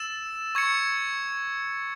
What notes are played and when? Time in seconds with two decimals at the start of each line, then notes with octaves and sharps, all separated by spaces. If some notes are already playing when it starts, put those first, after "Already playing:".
Already playing: E6 A6 E7
0.55 C#6 G#6 C#7